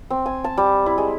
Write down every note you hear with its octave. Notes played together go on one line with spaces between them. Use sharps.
C4
G#5
A5
G3
E4
G#3